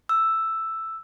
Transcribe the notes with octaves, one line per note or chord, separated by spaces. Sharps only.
E6